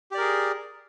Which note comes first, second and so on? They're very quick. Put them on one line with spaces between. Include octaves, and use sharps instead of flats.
G4 D5 A#4 G#4